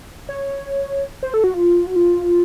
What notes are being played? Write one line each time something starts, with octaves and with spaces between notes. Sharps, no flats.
C#5
C5
A4
F#4
F4
F#4
F4